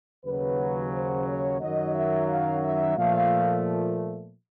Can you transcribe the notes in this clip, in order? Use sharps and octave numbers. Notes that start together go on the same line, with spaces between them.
D#2 C#3 F#3 B4
C5
C#5
F#2 D#3 F#3 D#5
E5
F5
E5
A#2 F3 A3 F5